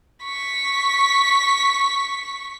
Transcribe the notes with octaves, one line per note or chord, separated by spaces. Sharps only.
C#6 B6